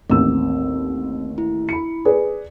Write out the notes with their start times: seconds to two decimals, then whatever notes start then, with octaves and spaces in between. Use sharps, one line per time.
0.10 A1 D#2 C4 E6
1.38 E4
1.69 B5 C#7
2.05 G#4 B4 D5